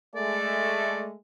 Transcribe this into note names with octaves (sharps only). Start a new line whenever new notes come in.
G#3 A3 D5